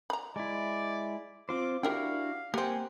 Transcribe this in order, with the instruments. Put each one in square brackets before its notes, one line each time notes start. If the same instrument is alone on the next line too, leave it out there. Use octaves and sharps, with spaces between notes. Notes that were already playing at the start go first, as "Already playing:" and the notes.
[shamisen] A#5 B5
[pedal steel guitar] G#3 E4 [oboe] D5
[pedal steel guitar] C4 F4 C5 [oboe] D6
[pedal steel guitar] D4 E4 F#4 [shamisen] G4 A#4 G5 [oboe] F5
[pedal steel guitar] A#3 F#5 G#5 [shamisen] C4 G4